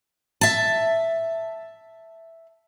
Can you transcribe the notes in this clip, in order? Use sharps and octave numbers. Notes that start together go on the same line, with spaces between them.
E5 A5